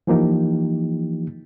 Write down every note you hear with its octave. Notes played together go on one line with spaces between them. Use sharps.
E3 F3 A#3 D#4 G4